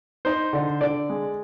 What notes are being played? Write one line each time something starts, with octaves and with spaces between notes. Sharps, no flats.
D#4 C5
D3
D3 D5
G#3